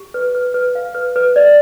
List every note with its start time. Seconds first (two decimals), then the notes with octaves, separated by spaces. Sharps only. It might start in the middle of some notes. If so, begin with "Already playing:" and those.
Already playing: G4
0.14 B4
0.35 B4
0.54 B4
0.75 F5
0.95 B4
1.16 B4
1.36 D5